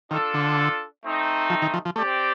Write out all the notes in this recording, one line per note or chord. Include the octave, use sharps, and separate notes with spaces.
D#3 D4 F4 A4
D3
A3 C4 D#4
F3
D#3
F3
F3
A3 C4 G4 D5